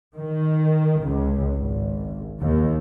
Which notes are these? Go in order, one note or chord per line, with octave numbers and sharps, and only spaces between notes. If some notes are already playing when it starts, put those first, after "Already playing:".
D#3
C#2
G#1
D#2